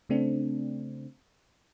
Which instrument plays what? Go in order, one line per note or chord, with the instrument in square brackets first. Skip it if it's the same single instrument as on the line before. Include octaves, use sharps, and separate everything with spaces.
[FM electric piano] C#3 A3 C4 D4